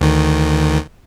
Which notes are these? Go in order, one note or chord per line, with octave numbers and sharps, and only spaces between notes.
D2 D#3